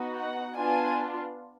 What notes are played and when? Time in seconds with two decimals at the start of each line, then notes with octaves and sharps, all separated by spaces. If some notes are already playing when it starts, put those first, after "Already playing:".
Already playing: B3 D#4 F#4
0.17 F#5
0.56 B3 D4 F4 G#5